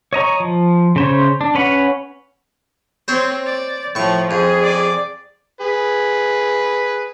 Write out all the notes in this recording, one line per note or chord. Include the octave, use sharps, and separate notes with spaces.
C#5 D#5 A#5 C#6
F3
C#3 C5 C#5
D4
C#4 B4 C#5 F#5
C4 C5 C#5
D5
A2 F3 C#6
F2 G#4
D5
G#4 B4